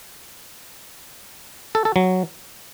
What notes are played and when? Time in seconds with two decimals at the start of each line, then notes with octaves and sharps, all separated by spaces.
1.75 A4
1.85 A4
1.96 F#3